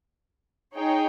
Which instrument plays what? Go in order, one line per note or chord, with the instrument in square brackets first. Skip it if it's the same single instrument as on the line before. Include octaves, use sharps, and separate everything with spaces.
[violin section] D#4 G#4 C#5 G5